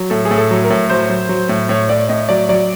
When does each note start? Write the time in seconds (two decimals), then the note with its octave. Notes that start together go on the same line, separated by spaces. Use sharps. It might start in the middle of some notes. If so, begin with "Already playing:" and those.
Already playing: F#3
0.10 A2 A4
0.25 G#4
0.31 A2
0.37 A4
0.51 F#3
0.64 A#4
0.70 A2
0.90 F#3 C5
1.10 F#3
1.29 F#3
1.49 A2
1.69 A2 C#5
1.89 A2 D5
2.09 A2 D#5
2.29 F#3 D5
2.49 F#3 D5